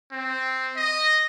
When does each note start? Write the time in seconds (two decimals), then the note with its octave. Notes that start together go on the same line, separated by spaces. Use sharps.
0.12 C4
0.76 D#5